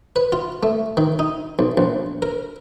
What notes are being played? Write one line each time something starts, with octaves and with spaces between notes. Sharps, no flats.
B4
F4
A3
D#3
D#4
B1
A#1
A#4